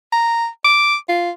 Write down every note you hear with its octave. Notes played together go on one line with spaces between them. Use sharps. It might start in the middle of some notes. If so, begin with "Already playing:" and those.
A#5
D6
F4